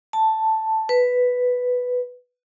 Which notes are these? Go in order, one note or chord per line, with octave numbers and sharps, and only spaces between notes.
A5
B4